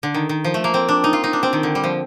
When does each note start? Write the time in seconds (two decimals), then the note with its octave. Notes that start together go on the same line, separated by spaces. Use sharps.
0.03 D3
0.14 D#3
0.29 D#3
0.44 F3
0.54 A3
0.64 A#3
0.74 C4
0.89 D4
1.04 D#4
1.13 F4
1.24 D#4
1.33 D4
1.43 C4
1.53 D#3
1.63 D3
1.75 G3
1.84 F3